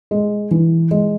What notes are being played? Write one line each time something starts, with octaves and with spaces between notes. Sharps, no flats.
G#3
E3
G#3